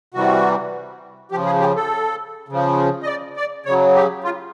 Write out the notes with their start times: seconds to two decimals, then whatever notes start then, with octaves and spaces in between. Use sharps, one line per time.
0.14 C3 E3 G3 F#4
1.31 C#3 F3 G4
1.46 G#4
1.60 G4
1.76 A4
2.48 C#3 F3
3.03 D#5
3.06 D5
3.36 D5
3.65 C#3 F#3 C#5
3.95 G4
4.24 F4